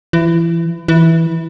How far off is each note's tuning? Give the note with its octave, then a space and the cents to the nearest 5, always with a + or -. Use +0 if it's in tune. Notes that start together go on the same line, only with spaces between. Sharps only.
E3 +25
E3 -10